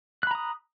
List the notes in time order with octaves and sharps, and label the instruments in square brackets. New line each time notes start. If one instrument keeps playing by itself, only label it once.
[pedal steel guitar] F#6
B5
A#5
D#6